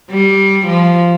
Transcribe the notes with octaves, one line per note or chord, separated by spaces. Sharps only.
G3
F3